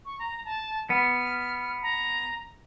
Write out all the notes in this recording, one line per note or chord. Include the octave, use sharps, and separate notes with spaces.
C#6
A#5
A5
B3 F6
A#5